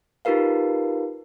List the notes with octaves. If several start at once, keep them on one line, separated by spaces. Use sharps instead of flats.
D#4 F4 G4 A#4 B4 F5